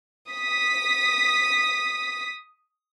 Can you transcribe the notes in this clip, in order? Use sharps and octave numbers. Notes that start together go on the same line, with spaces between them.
D#6 B6